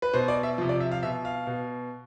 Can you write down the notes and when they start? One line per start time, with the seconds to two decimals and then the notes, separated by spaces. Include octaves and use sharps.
0.02 B4
0.13 B2 C5
0.28 D5
0.43 E5
0.58 C3 F3
0.69 D5
0.80 E5
0.91 F5
1.03 B2 E5
1.25 F5
1.47 B2